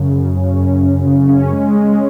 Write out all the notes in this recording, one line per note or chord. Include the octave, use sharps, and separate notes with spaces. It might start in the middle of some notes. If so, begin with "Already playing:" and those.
Already playing: F#2 C#3
C#3
C#4
F#2
F#2
C#3
C#4
G#3
G#3